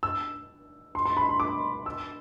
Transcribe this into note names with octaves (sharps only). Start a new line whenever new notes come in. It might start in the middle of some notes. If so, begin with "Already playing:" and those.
E6
C6
C6
B5
C6
D6
E6